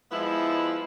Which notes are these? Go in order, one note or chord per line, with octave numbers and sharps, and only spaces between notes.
F3 G#3 B3 E4